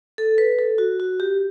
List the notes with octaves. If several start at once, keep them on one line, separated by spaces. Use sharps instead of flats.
A4
B4
A4
F#4
F#4
G4